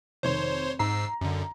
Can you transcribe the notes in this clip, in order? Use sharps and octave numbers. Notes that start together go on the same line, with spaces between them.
F1 D#3 C4 C5 C#5 C6
G#2 A#5 E6 C7
F#2 D3